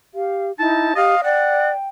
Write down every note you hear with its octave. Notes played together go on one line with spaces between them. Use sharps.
G4 F5
D#4 E4 A5
G4 D#5 F5
D5 F#5 G5